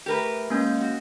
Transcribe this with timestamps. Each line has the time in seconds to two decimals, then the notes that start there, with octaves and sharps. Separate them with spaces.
0.06 A3 G4 A#4 B4
0.50 G#3 A#3 C#4 G6
0.81 F#4